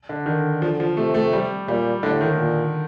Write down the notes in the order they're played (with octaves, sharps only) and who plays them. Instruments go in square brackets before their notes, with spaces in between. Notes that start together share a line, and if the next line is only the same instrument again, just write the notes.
[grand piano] D3
[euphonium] D3 [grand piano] D#3
[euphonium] D3 [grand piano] F3
[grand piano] F3
[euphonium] C3 [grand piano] A3
[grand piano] A3
G3
[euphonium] A#2 [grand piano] G3
[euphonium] A2 [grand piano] D3
[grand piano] D#3
[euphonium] A#2